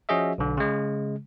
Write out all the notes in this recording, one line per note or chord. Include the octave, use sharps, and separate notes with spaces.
F3 C#4 F#4 G#4 D#5 E5
B1 D3
C#3 G#3